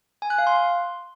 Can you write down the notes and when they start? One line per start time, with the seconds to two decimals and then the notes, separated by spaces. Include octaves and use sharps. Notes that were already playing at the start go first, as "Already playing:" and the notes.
0.22 G#5
0.30 F#6
0.38 F5
0.47 C6